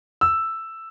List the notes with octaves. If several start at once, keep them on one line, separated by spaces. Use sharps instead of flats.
E6